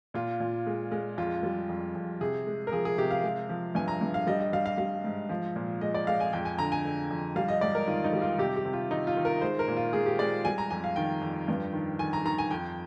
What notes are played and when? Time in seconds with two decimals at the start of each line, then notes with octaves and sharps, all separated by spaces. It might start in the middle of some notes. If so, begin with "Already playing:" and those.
0.14 A#2 F4
0.40 A#2
0.67 G#3
0.91 G#3
1.18 F2 F4
1.43 G3
1.69 F2
1.95 F2
2.21 C3 G#4
2.47 G#3
2.67 A#4
2.72 F3 G#4
2.85 G#4
2.98 C3 G4
3.11 F5
3.23 G#3
3.49 F3
3.75 G2 G#5
3.88 A#5
4.01 G2
4.14 F5
4.27 G3 D#5
4.40 D#5
4.53 G3 F5
4.66 F5
4.78 G3 F5
5.04 G#2
5.29 F3
5.56 A#2
5.81 G#3 D#5
5.94 D5
6.07 G#3 F5
6.20 G#5
6.33 F2 G5
6.45 G#5
6.59 D3 A#5
6.72 G#5
6.85 D3
7.11 F2
7.36 G3 F5
7.48 D#5
7.61 G#2 D5
7.75 A#4
7.87 D#3 F4
8.04 D#4
8.13 G3
8.22 F4
8.38 C3 G4
8.56 G4
8.65 C3
8.73 F4
8.91 D#3 D#4
9.07 F4
9.17 D#3
9.25 A#4
9.41 G#3 C5
9.59 A#4
9.68 A#2
9.77 F4
9.93 G#3 G#4
10.06 G4
10.19 G#3 D5
10.45 G3 G#5
10.58 A#5
10.70 F2 G#5
10.84 F5
10.96 D#3 G5
11.22 F2
11.48 G2
11.73 D#3
11.99 D#3 G#5
12.13 A#5
12.25 D#3 A#5
12.38 G#5
12.51 F2 G5